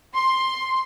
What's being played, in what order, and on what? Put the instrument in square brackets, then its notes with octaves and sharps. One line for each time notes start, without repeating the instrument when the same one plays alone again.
[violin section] C6